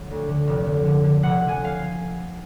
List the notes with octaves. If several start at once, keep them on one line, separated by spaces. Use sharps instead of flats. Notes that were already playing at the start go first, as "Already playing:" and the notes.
Already playing: D3 F#3
D2
D3
F1
D3
D3
D3
F1 F#5
F1
G#5
F5